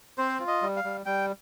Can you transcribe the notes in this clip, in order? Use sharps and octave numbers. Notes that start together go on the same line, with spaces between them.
C4 C5
F4
D#5
G3
F5
G3
G3 G5